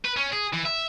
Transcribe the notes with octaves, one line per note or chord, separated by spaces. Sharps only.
B4
C#4
G#4
E3
E5